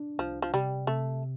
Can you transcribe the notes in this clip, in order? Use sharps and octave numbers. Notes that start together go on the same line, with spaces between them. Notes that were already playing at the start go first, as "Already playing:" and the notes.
Already playing: D4
C2 F3
F3
C3 G3
C3 A3